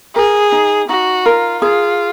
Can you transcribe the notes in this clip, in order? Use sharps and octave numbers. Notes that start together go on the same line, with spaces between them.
G#4 A#4
D#4
D#4 F#4
F4 A#4
F4 G#4